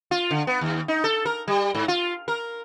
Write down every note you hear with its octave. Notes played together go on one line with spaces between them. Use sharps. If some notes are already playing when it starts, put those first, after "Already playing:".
F4
D3
B3
D#2
D#4
A4
A#4
G3
G#2
F4
A#4